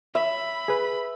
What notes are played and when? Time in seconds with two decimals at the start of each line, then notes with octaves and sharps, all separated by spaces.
0.15 E5 B5
0.68 G#4 B4